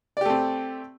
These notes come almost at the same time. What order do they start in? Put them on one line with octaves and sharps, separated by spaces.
D5 G4 A3 C4